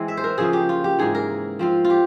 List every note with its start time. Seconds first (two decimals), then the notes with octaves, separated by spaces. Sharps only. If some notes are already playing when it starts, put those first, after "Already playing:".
Already playing: E3 G#3 C4
0.08 E5
0.17 C5
0.24 A#4
0.38 C#3 F3 A#3 G#4
0.53 G4
0.69 F4
0.84 G4
0.99 G#2 E3 G#3 G#4
1.15 A#4
1.59 F3 C4 F4
1.84 F4
1.90 G4